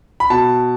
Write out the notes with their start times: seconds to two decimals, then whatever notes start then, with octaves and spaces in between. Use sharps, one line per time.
0.20 B5
0.30 B2 A5